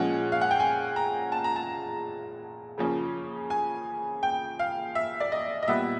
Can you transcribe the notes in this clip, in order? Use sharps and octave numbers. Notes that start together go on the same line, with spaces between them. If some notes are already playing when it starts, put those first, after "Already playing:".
Already playing: A#2 F3 G#3 C#4 F#5
F5
F#5
G5
G#5
A#5
A5
A#5
A5
C#3 F3 A#3 C#4
G#5
G5
F5
E5
D5
D#5
D#5
A#2 G3 B3 E5